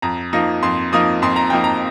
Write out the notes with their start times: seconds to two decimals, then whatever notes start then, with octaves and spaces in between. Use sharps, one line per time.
0.02 F2 A#5
0.33 F3 A#3 D#4
0.63 F2 C6
0.92 F3 A#3 D#4 D#6
1.22 F2 C6
1.36 A#5
1.50 F3 A#3 D#4 G5
1.64 A#5